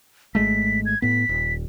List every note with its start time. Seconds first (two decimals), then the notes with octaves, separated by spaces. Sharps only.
0.35 G#1 G#3 A3 B6
0.86 G#6
1.02 A2 B3 B6
1.29 D#1